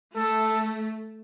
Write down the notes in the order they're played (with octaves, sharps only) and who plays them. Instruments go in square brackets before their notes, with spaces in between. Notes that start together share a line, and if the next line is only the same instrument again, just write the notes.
[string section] A3 [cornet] A4